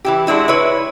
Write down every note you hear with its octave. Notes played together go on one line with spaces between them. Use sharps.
E3 E4 G4
G#3 D4 E4 F#4
E4 B4 C#5